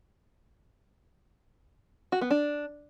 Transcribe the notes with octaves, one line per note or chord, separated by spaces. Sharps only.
F#4
B3
D4